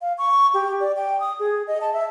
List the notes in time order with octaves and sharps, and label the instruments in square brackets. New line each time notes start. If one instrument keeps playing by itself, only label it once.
[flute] F5
C#6
G4
D5
G5
D#6
G#4
D#5
A5
E5